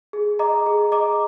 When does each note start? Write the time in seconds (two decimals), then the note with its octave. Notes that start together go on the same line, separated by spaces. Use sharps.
0.13 G#4
0.39 D#5 A#5 D6
0.66 G#4
0.92 D#5 A#5 D6